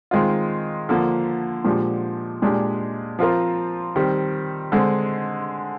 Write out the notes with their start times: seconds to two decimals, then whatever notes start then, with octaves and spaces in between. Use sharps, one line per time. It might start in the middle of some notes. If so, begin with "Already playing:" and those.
0.11 D#3 G#3 C4 F4
0.89 D3 F3 A#3
1.65 A#2 F3 G#3 D4 G4
2.42 A#2 G#3 D4 G4
3.19 F3 C4 F4 A#4
3.96 D#3 G3 C4
4.72 D3 G#3 C4